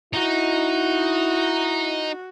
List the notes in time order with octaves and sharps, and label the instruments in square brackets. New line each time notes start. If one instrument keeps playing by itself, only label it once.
[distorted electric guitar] D#4 [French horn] E4 [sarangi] F#4